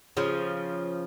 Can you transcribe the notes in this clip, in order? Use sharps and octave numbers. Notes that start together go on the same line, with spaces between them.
C#3 F3